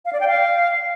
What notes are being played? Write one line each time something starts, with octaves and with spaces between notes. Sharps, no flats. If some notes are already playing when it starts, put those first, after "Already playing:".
F5
D5
G5
F5